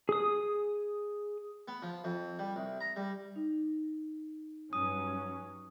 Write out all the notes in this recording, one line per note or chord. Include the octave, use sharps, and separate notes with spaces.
G#4 D#6
B3
F3
F2
G3
C2
A#5
G3
D#4
G2 F#3 C#4 D#6